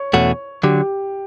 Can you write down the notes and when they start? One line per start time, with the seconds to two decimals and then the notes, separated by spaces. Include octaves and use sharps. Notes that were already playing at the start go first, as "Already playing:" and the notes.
Already playing: C#5
0.13 E2 B2 A3 C#4 F#4
0.63 D3 F#3 G4